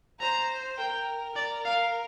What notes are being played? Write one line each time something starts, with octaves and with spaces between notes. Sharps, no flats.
C5 A#5
A#4 G5
A#4 D5
F5